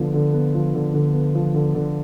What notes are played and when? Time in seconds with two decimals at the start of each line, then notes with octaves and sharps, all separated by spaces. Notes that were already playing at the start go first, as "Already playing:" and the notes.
Already playing: D3 F3 B3
0.14 D3
0.33 B3
0.54 F3
0.74 D3
0.94 D3
1.13 B3
1.35 F3
1.54 D3
1.74 D3